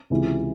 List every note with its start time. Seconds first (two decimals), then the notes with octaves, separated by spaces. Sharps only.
0.10 C#2 C3 E3